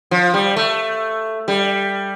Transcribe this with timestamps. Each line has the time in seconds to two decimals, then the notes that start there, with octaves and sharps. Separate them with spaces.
0.11 F3
0.34 G3
0.57 A3
1.48 G3